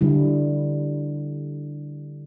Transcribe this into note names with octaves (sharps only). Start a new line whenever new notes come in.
D3 G3 E4